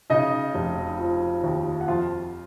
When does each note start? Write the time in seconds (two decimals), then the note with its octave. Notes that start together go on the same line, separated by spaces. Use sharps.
0.10 C#3 D#4 D#5
0.55 F1
0.99 F3
1.44 D#2
1.81 F#5
1.88 F2 F4 F5